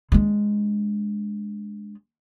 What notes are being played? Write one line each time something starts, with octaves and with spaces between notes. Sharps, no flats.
G#3 D4